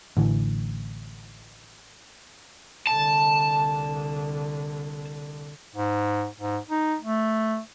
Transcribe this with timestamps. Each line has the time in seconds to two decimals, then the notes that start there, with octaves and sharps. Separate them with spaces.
0.17 A1 D3 E3
2.87 C2 D3 A5
5.75 G#2
6.40 G#2
6.70 D#4
7.02 A3